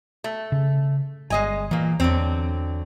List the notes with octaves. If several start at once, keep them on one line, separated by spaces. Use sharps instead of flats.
A3
C#3
G1 G#3 D#5 G#5
A#2 E3 A#3
E2 D3 F#3 C4